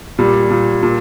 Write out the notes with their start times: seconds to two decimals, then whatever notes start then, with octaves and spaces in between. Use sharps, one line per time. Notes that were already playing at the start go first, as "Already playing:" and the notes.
0.19 A#2 G3
0.51 A#2
0.83 A#2